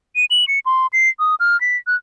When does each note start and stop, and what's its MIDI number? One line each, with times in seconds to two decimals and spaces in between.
0.16 0.25 99
0.31 0.47 102
0.48 0.59 97
0.66 0.87 84
0.93 1.09 96
1.20 1.35 87
1.40 1.59 89
1.61 1.77 95
1.87 1.95 90